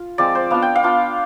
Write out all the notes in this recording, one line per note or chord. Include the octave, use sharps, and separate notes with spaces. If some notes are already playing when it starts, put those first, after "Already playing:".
Already playing: F4
F3 G#3 C4 D5
C5
B3 D4 F4 F5
G5
F5
B3 D4 F4